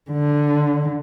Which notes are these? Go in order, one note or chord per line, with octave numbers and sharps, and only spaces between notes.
D3